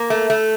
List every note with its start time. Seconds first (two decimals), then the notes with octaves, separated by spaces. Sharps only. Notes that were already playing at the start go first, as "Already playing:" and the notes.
Already playing: A#3
0.10 A3
0.30 A3